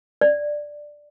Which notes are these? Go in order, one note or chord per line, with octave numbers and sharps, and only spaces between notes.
D5